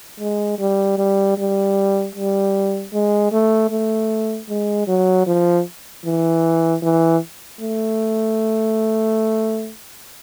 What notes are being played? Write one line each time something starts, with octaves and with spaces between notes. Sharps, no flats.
G#3
G3
G3
G3
G3
G#3
A3
A3
G#3
F#3
F3
E3
E3
A3